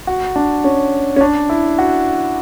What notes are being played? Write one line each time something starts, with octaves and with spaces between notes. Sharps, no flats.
F#4
D4
C#4
C#4
D4
E4
F#4